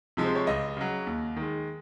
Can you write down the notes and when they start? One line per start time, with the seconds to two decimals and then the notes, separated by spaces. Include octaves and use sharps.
0.17 C3 F3 G#3
0.24 C5
0.35 C#5
0.47 C#2 D#5
0.77 C#3 F#3
1.06 D#2
1.36 D#3 G#3